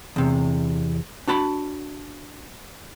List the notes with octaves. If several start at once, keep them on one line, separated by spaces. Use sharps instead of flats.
E2 C3
D4 F#4 A5 B5